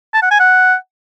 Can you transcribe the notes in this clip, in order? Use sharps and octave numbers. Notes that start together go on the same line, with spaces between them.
A5
F#5
G#5
F#5